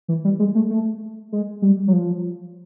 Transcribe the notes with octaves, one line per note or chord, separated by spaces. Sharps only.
E3
G3
G#3
A3
A3
G#3
G3
F#3
F3